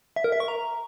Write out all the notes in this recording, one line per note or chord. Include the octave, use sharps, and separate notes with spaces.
E5
A#4
E5
C#6
A#5